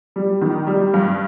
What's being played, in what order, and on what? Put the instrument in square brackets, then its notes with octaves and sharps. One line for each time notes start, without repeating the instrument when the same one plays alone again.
[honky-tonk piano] G3
D#3
G3
G2